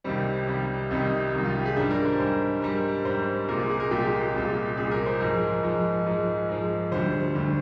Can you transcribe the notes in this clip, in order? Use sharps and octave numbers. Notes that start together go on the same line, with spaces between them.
C2 C3 D#3 G3 C4
C2 C3 D#3 G3
C2 C3 D#3 G3 D#4
C2 C3 D#3 G3
F4
G4
G#4
G#2 G3 D4
A#4
C5
G#2 G3 C5
G#2 G3 A#4
G#2 G3 C5
C2 A#2 G#3 A#4
G#4
G#4
A#4
C2 A#2 G#3 G4
C2 A#2 G#3
C2 A#2 G#3 G#4
A#4
C5
G#2 F3 G#3 A#4
G#2 F3 G#3
G#2 F3 G#3
G#2 F3 G#3
D2 D3 G3 C5
D2 D3 G3